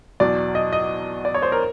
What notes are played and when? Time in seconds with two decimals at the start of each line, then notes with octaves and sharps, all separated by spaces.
0.20 E2 B2 F#3 D5
0.55 D#5
0.73 D#5
1.25 D5
1.35 C#5
1.42 C5
1.52 A#4